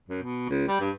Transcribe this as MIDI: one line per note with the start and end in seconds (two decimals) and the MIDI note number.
0.09 0.21 42
0.22 0.48 47
0.49 0.64 37
0.68 0.79 55
0.80 0.90 43